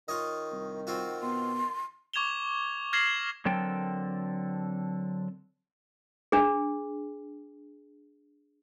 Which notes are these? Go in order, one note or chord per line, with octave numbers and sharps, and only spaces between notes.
D#3 F4 C#5 D#5
C2
C4 F4 F#4
B2 C6
C#6 D6 G#6 E7 F7 G7
F6 G#6 A#6 C7 E7 F#7
D3 F#3 C4 A4 A#4 G5
D4 G#4